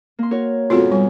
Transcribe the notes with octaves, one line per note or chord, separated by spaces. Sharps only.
A#3 C6
F#4 A#4 C#5
F2 G#2 B2 F4 F#4 A4
G3 G#5